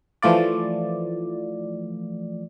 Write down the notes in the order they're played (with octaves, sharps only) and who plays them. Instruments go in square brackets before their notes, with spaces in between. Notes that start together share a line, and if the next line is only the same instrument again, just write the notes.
[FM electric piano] E3 F3 A3 F4 D5